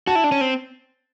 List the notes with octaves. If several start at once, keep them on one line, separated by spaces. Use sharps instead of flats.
F#4 A5
E4
D4
C#4
C4